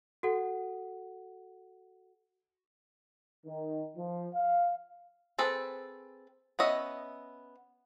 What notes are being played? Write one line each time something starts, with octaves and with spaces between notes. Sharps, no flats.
F#4 A4 F#5
D#3
F3
F5
C4 G#4 A4 B4
B3 C#4 D#5 E5